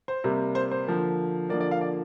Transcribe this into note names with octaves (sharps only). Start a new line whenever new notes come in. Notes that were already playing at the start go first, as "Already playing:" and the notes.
C5
C3 G3 A#3
C5
C5
D3 F3 A#3
D3 F3 A#3 D5
D5
F5
D5